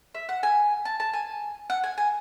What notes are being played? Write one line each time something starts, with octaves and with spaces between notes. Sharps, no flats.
E5
F#5
G#5
A5
A5
G#5
F#5
G#5
G#5